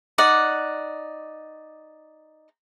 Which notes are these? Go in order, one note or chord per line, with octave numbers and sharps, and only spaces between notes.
D#4 D5 F#5